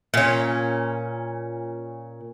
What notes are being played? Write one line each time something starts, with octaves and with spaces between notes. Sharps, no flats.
A#2 C#4